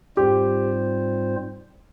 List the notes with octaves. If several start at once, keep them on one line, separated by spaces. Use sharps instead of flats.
G#2 G3 C4 F4 G4 C5